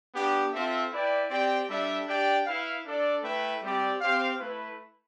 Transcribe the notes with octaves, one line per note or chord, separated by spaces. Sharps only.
B3 D4 G4
C4 F4 A4 E5
E4 B4 D5 G5
C4 G4 D5 G5
G3 D4 A4 E5
D4 G4 D5 G5
E4 B4 F5
D4 A4 D5
A3 E4 B4 E5 G5
G3 C4 G4 D5
C4 G4 C5 F5
A3 E4 B4